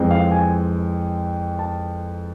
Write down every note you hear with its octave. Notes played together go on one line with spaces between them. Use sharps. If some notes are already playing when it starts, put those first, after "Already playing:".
Already playing: F2 E3 G#3 C4
F5
G#5
A5